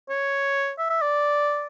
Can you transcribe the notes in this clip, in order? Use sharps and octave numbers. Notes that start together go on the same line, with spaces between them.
C#5
E5
E5
D5